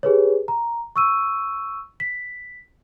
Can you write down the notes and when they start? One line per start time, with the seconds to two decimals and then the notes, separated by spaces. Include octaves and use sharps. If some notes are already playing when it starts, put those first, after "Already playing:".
0.03 G4 G#4 B4 C#5
0.48 A#5
0.96 C#6 E6 D#7
2.00 B6